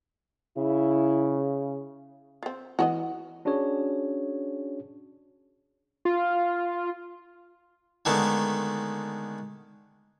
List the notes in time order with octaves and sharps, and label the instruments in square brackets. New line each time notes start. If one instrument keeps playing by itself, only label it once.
[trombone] C#3 [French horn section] E4
[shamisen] C4 F4
[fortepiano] E3 [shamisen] F#4 C#5 D#5
[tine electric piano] C#4 D4 F#4 G#4 C#5
[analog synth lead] F4
[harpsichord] D3 D#3 G#3 A3 B3